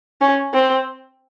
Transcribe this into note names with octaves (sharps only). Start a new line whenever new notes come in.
C#4
C4